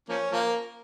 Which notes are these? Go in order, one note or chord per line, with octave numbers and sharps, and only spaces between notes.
F3 A#3 C#4
F3 A#3